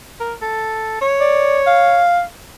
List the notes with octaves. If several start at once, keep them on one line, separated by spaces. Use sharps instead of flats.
A#4
A4
C#5
D5
F5